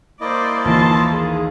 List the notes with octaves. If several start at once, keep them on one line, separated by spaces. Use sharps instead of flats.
A#3 E4 C5 D5 D#5
A#1 D#2 E3 D#4 A5 C6
G#4